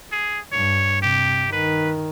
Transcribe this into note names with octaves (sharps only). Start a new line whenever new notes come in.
G#4
G2 C#5
C3 G4
D#3 B4